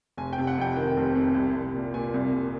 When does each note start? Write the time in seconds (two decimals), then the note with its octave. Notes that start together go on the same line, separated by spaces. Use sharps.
0.17 F1 G#5
0.33 G5
0.38 C3
0.47 F#5
0.58 F2 G5
0.76 D#3
0.97 F1
1.16 C3
1.35 C2
1.55 C2
1.74 A#2
1.94 A#2 G#5
2.14 C2
2.33 C2